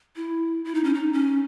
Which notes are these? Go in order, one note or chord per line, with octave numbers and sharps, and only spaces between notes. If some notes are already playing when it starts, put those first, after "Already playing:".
E4
E4
D#4
C#4
D#4
C#4